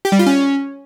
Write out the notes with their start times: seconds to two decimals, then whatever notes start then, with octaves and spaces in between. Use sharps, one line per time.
0.05 G4
0.12 G3
0.19 F4
0.26 C#4